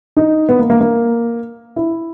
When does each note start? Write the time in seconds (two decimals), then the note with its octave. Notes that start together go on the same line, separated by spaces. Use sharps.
0.17 D#4
0.49 B3
0.59 A#3
0.70 A#3
0.81 A#3
1.76 E4